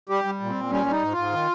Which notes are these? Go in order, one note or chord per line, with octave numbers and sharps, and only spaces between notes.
G3 G4
G3
A#2
C4
A#2
G3 C#4
G3
D#4
G#2
F4
G#2
D#3